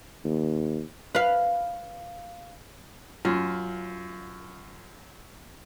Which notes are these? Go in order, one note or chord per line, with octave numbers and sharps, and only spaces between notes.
D#2
B4 F5
F#2 F4